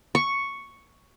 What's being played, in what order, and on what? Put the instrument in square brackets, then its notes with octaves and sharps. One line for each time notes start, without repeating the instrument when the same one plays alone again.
[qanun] C#6